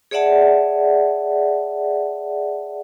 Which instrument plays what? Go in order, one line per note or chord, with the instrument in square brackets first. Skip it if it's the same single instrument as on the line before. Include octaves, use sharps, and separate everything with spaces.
[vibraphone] G#4 C#5 D5 E5 F#5 A5